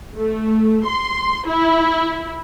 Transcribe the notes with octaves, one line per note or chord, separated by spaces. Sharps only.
A3
C6
E4